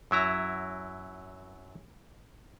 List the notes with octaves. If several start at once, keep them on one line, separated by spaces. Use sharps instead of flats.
F#2 F#3 E4 A#5